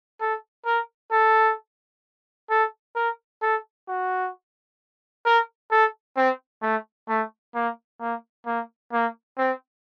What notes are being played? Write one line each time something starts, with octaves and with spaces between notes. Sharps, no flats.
A4
A#4
A4
A4
A#4
A4
F#4
A#4
A4
C4
A3
A3
A#3
A#3
A#3
A#3
C4